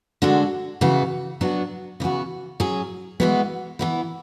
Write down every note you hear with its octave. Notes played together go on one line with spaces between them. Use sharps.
D3 G#3 D4 F#4 A4
C#3 E3 B3 F#4
F#3 B3 D4 F#4
C#3 E3 B3 F#4
F#3 C#4 G#4
E3 G#3 B3 F#4
E3 B3 E4